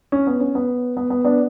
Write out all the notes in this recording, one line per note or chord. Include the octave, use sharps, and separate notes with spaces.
C#4
B3
C#4
B3
B3
B3
B3 D4